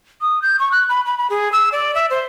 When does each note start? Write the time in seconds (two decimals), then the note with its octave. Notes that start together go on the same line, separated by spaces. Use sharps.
0.21 D#6
0.42 G6
0.60 C#6
0.72 F#6
0.89 B5
1.06 B5
1.18 B5
1.30 G#4
1.52 E6
1.72 D5
1.95 E5
2.10 C5